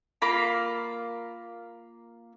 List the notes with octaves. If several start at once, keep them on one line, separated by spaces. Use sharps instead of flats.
A#3 F4 F5 B5